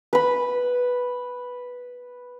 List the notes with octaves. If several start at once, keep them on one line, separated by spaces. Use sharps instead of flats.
B4 B5